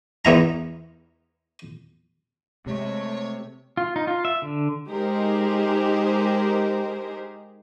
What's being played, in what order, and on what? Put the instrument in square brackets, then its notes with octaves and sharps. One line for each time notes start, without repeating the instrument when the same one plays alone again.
[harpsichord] E2 B3 E4 A#5
[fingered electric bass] C3 [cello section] G#3 A3 [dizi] C#5
[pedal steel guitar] F4
D#4
F4
E5
D3
[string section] G#3 D#4 G4 G#4 A#4 C5